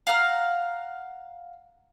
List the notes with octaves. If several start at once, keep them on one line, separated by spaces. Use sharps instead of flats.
F5 F#5 A#5 F6